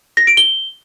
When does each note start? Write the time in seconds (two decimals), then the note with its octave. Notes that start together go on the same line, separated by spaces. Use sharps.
0.17 A#6
0.27 D7
0.37 G7